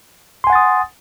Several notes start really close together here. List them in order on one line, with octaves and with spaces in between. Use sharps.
C6 G#5 F#5 A6 D#6